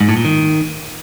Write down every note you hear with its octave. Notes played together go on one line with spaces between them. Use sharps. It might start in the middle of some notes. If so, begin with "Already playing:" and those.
G#2
A2
A#2
D#3